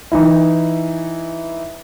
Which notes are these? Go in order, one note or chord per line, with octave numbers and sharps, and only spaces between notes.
E3 D#4 E4